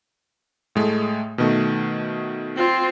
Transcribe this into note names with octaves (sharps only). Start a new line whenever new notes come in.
A2 G#3 A3
B2 D#3 A3
C4 F4